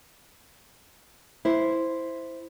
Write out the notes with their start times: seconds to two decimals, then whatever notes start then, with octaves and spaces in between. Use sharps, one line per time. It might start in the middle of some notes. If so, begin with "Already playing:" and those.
1.45 E4 C5